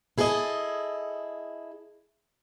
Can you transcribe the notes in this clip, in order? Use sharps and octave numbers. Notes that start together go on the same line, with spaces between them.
E4 G#4 A4 B4 D#5